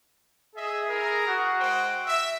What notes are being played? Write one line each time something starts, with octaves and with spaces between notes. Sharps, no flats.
G#4 D#5 E5
E4 A#4
F#4
G#3 C5 G5
E5 E6